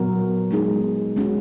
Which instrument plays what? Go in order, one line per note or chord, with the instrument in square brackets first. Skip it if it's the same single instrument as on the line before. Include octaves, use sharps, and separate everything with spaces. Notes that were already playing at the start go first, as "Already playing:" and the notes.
Already playing: [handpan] A#2 F#3 B3 F#4 A#4
G#3 B3 D#4 G#4
G#3 C#4 F#4